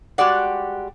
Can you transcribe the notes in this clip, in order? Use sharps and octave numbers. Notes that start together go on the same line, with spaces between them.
G3 G#3 F#4 G4 D5 F#5